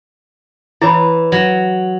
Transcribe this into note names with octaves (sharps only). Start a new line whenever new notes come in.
E3 E4 C#5 B5
F#3